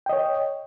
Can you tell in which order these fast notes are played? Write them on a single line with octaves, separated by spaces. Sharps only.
G5 D#5 C#5